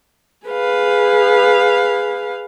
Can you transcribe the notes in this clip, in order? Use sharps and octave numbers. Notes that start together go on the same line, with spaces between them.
G#4 B4 F5